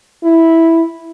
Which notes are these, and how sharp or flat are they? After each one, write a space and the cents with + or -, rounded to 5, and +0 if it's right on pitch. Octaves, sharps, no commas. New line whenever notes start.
E4 -5